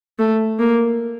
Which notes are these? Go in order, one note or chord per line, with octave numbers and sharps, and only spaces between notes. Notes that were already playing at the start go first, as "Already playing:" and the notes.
A3
A#3